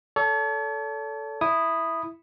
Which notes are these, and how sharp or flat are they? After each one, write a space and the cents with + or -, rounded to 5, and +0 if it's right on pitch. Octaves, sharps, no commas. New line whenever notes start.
A4 +0 C#5 +45
E4 +0 D#6 -5